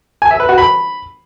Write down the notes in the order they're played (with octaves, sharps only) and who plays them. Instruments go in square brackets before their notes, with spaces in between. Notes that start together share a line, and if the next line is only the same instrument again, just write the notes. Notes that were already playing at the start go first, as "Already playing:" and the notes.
[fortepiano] G#5
E5
B4
F#4
B5